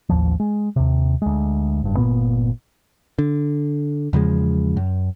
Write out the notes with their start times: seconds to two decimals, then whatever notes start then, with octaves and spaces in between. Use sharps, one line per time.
0.09 A1 D#2 F3
0.40 G#3
0.76 D#2 C3
1.22 D2 G#3
1.83 F#1 G2
1.97 G1 F#2 A#2 B3
3.19 D3
4.13 E2 C#3 F3 G#3
4.77 F#2